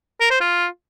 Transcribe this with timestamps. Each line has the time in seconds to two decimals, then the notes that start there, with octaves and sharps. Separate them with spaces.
0.21 A#4
0.31 C5
0.40 F4